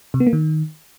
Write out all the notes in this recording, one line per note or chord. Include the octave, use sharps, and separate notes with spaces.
C3
B3
A#3
D#3